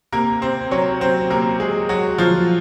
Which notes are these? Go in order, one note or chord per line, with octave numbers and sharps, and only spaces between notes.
C3 A#3 A#4
C3 C4 C5
F#3 C#4 C#5
F#3 C4 C5
C3 A#3 A#4
C3 G#3 G#4
F#3 F#4
F3 F#3 F4